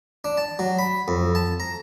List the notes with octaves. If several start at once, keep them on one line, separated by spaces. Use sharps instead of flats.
D4
A5
F#3
B5
F2
A5
A#5